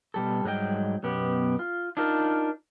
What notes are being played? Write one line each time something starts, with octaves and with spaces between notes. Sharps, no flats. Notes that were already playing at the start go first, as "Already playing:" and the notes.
B2 G3 A4
G#2 F#3 G3 D#5 G5
F#2 B2 B3 G4
F4
D4 D#4 F4 A#4